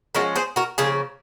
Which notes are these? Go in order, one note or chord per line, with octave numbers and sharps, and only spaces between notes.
F3 G#3 C#4 F#4 A#4
G#4 C5
F#4 A#4
C#3 F3 A#3 F4 G#4